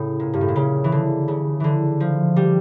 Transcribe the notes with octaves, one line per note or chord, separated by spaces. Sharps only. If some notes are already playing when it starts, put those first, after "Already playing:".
Already playing: A2 C#3
A#2
G2
A2
A#2
C#3
E3
D3
C#3
D3 E3
F3
G3